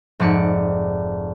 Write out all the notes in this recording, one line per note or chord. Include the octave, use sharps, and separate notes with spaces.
F1 G#2 D5 C#7